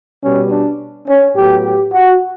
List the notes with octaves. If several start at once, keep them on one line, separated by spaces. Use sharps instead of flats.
B2 G3 B3 C#4
D4
C#4
A2 F#3 B3 G4
G4
F#4